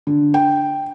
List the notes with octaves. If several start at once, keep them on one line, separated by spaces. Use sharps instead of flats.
D3
G5